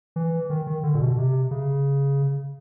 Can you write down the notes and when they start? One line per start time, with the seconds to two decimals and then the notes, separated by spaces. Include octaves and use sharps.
0.16 E3
0.50 D#3
0.67 D#3
0.83 D3
0.95 A#2
1.00 B2
1.18 C3
1.51 C#3